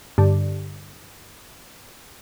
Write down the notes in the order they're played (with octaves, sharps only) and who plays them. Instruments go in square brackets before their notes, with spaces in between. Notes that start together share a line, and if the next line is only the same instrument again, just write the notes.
[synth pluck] G2 D3